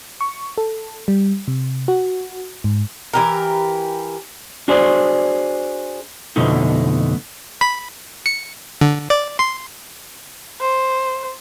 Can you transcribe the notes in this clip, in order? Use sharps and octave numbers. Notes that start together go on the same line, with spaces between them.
C#6
A4
G3
C3
F#4
G#2
E3 G4 A#4
D4 F#4 G#4 C5 D5
F2 B2 D3 A3 D#4
B5
C#7
D3
D5
C6
C5